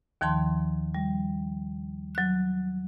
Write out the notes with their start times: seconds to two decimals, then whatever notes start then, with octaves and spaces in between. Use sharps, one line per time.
0.21 D#2 D#3 F3 A5 C6
0.95 G3
2.15 F#3 F#6